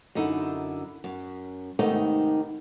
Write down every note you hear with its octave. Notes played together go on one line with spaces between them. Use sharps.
F#2 D3 D#4 E4
F#2
G#2 C3 D#3 A3 B3 D#4